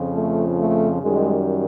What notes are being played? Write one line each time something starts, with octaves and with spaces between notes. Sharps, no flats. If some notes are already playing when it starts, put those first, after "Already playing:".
Already playing: F2 C#3 F3
A3
A3
F#2 D#3 G3 G#3